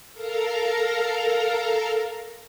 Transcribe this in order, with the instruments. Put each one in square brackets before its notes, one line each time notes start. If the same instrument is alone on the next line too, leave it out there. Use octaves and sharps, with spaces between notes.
[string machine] A4 A#4 F5 A#5